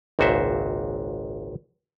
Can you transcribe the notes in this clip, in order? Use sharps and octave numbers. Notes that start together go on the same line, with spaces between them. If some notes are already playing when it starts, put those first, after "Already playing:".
G#1 C#2 A#2 F#4 C5 E5